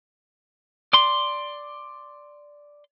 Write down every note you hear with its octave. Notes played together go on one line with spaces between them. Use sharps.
D5 C6